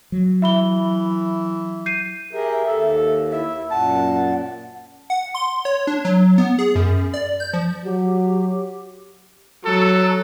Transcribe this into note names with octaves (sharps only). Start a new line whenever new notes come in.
F#3
E3 E5 B5 G7
G6 C7 D#7
G4 G#4 A#4 E5
D#2 A4
E4 E5
F#2 A#2 F#5 A5
F#5
C6
C#5
D4
F#3
B3
G#4
F#2
D5
G6
F3
F#3 G4
F#3 A4